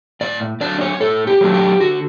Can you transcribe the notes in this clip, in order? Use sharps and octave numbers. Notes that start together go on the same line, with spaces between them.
A2 D5
F#3 A3 D4 D5
C#5
A2 A4
G4
F#3 A3 D4
G4
D3 F#4